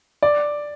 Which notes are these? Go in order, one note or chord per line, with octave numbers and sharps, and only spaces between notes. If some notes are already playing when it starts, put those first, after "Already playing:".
D5